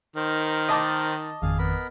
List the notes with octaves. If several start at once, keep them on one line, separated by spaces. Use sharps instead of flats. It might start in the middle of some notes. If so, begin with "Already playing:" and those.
D#3 A#4 C5
D#5 A5 D6
G#1 F2 D#3 G#4 F5
B3 A#4 B5